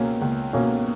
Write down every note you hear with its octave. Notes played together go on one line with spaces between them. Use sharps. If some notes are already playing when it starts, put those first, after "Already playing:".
Already playing: C#2 B2 A#3 C#4
C#2
B2 A#3 C#4